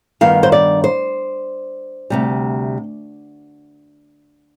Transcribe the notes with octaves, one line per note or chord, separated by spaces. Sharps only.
G2 D#3 B3 F5
C5
D5
C5
D2 C3 G3